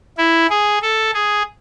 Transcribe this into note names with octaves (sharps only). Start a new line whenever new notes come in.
E4
G#4
A4
G#4